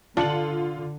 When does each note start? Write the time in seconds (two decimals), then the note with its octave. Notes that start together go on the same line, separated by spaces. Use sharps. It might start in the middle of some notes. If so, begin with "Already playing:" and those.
0.17 D3 D4 F4 C#7 F#7